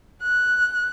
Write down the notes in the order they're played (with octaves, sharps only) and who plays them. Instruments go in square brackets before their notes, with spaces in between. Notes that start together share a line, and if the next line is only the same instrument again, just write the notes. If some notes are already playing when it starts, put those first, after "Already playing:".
[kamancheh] F#6